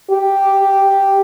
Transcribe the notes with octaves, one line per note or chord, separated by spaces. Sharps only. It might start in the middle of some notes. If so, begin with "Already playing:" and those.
G4